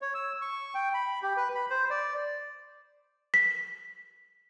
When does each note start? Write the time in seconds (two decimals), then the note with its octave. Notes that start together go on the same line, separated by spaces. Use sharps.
0.02 C#5
0.14 E6
0.42 C#6
0.75 G5
0.94 B5
1.23 G4
1.37 B4
1.55 B5
1.70 C5
1.90 D5
3.34 B6